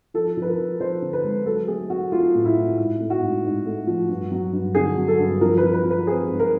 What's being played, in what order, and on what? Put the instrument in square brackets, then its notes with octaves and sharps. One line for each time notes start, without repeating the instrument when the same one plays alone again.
[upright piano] F3 A4
F3 B4
A#4
F3
F3 C5
D3
B4
G#3
F#3 A4
A3 G#4
A3 F#4
A3 F4
A2
E4
A2
G#2 E4
A3
F#4
G#2
G#2
A3
F3
G2
F#3
G2
D3 G#4
F#3
A4
G2
F3 A#4
B4
F3
B4
F3
B4
C4 G#4
G#2
A#4